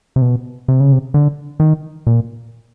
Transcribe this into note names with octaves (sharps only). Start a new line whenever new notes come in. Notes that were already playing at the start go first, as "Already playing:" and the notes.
C3
B2
C3
C#3
C3
D3
D#3
A#2